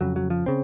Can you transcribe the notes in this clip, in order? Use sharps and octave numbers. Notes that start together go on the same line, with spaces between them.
F2 C#3 F#3
F#3
F3
C#3 C4